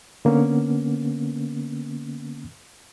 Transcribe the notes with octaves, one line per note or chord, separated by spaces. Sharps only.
D3 A#3 B3 C#4